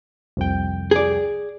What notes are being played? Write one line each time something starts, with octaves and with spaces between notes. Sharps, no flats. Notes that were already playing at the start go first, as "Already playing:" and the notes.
C2 F2 G5
G#4 D5